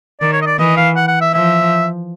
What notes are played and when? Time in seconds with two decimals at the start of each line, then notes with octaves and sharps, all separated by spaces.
0.21 D#3 D5
0.33 C#5
0.42 D#5
0.46 D5
0.59 E3 D#5
0.77 F5
0.96 F#5
1.08 F#5
1.21 E5
1.33 F3 E5